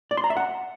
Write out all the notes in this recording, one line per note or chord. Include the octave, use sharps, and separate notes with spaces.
D5
C6
A#5
E5
F#5